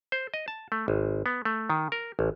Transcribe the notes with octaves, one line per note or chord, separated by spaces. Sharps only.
C5
D#5
A5
A3
G#1
B3
A3
D#3
A#4
A1